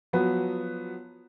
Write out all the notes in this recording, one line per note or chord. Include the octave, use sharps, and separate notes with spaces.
F3 F#3 B3 F#4 B4